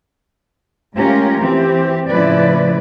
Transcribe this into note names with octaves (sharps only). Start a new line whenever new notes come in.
G#3 A3 C#4 F4 G4 A#4
E3 C4 G4
A2 C#3 F3 E4 B4 D5